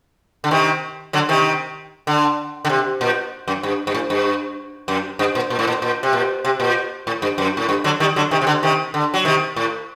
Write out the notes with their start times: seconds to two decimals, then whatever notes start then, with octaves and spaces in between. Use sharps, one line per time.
0.44 D3
0.51 C3 D#3
1.13 D3 F#3
1.29 C3 D#3
2.07 D3
2.65 D3
2.69 C3
3.01 A#2
3.48 F#2
3.63 G2
3.87 G2
3.94 A2
4.10 G2
4.88 F#2
5.19 G2
5.35 A#2
5.50 A#2
5.59 A2
5.67 A#2
5.82 A#2
6.03 C3
6.13 A#2
6.45 C3
6.60 A#2
7.07 A2
7.22 G2
7.38 F#2
7.57 A2
7.69 G2
7.84 D3 F#3
8.00 D#3 G3
8.16 D3 F#3
8.31 C3 D#3
8.41 C3
8.47 D3
8.63 C3 D#3
8.94 D3
9.14 F#3
9.25 C3 D#3
9.56 A2